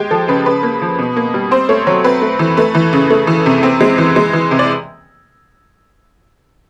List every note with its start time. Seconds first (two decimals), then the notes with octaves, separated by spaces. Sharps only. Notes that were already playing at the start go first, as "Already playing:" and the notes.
Already playing: G#3 G4
0.11 F3 A4
0.28 C#3 B4
0.46 C#3 B4
0.63 A#3
0.82 F3
0.98 B2
1.16 A#3
1.34 G3
1.51 C4 C5
1.69 A3 C#5
1.87 F#3 C#5
2.04 C4 B4
2.22 A3
2.39 E3
2.57 A3 B4
2.74 E3
2.93 C#3
3.10 A3
3.27 E3
3.46 C3
3.63 C4
3.81 G#3
3.98 E3
4.16 G#3
4.33 E3
4.51 C3
4.59 D5